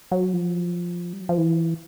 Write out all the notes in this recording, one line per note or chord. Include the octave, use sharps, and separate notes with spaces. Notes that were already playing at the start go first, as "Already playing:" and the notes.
F#3
F3
G3
F#3
F3
E3